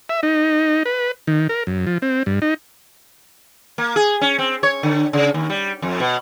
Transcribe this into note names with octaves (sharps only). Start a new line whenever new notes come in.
E5
D#4
B4
D#3
A#4
F#2
F3
C4
G2
D#4
A#3
G#4
C#4
C4
C#5
D3
C#3
D#2
G3
F2
B2